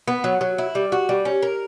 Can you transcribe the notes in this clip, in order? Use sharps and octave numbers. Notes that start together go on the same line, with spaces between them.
B3
F#3
F#3
E4
G3
F#4
G3
C#4
A#4